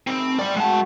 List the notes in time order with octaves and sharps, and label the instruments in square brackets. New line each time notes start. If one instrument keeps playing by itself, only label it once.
[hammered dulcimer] D#3 G#4 B5 [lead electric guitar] C4
[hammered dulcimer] A3
[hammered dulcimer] A2 C4 E4 [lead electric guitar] D5 B5
[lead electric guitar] G#3 A5 [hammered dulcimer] F#4 C#5